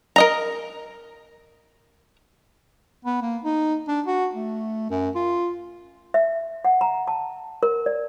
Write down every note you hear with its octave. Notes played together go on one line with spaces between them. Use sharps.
A#4 D#5 A#5
B3
A#3
D#4
D4
F#4
A3
F#2
F4
E5
F#5
A#5
A5
A#4
D5